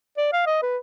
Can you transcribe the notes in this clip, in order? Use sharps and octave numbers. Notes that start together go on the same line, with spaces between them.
D5
F5
D#5
B4